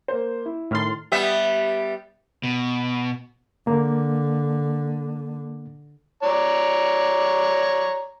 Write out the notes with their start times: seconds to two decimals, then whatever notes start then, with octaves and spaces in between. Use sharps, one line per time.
0.08 A#3 C5
0.46 E4
0.71 A2 D#3 C6 F6 A6
1.12 G3 B3 E5
2.44 B2
3.67 D3 A#3
6.23 C#5 D5 A#5